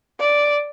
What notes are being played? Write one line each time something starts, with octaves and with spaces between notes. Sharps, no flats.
D5